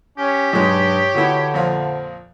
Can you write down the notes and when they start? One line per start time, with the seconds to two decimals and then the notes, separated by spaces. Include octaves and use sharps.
0.18 C#4 G4
0.53 B1 G2 G#3 C#5
1.14 B2 D3 B3 E4
1.54 F2 A#2 F3